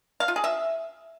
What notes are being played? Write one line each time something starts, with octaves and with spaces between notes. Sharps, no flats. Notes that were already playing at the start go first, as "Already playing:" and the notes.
F5
F4
G#4
E5